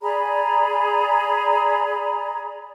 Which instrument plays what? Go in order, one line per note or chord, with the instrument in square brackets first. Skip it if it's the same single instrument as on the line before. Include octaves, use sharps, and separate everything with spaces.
[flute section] G#4 D5 A#5 B5